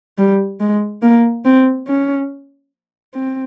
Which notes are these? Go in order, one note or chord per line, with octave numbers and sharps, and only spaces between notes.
G3
G#3
A#3
C4
C#4
C4